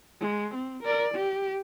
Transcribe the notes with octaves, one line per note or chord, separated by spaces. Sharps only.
G#3
C4
A#4 D5
G4